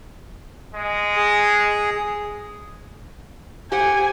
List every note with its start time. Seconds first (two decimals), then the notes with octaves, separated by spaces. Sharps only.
0.75 G#3
1.16 G#4
3.72 G4 C5 F#5 G#5